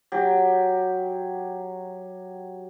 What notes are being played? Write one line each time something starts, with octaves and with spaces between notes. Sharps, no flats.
F#3 G4